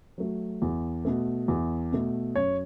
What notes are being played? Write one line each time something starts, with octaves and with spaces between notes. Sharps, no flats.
F#3 A3
E2
B2 A3
E2
B2 A3
F#2 C#5